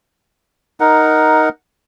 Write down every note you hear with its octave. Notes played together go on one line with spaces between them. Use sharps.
D#4 A#4 F#5